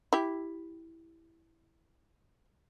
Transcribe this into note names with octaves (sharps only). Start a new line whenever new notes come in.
E4 G4